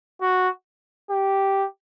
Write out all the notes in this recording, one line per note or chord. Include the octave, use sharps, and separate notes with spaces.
F#4
G4